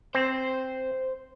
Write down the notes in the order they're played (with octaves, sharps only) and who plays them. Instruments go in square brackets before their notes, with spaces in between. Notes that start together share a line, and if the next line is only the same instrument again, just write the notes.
[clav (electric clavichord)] C4 [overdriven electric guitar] C5